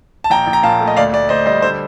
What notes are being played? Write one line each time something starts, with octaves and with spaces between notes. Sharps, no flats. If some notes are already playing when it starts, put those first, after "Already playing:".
A5
A#1 G5 A#5
A#1
A#5
A#2 F5 A5
A3
D#5
D2 D5 F5
D2 D5
D2 C5 D#5
G3 C5 D#5
D3 C5